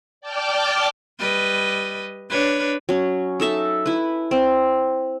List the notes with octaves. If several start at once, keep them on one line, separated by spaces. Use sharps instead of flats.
D5 G5 A5 D6 F6 G6
G3 B4 D#5
D4 B4 C#5
F#3 C#4
D#4 A4 E5 A5
E4 B4
C4